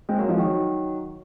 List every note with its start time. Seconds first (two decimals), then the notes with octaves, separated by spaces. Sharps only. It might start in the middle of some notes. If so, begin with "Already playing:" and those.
0.09 G#3 C4
0.18 F#3 A#3
0.29 F3 G#3
0.39 D#3 F#3